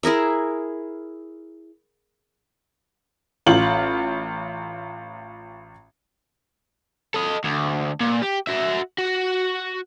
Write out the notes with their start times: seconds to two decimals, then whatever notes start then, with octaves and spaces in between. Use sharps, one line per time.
0.03 E4 G#4 A#4 E5
3.46 A1 F4 F#7
7.14 A4 D#5
7.45 D2
8.01 A#2
8.22 G4
8.47 F#4 E5
8.98 F#4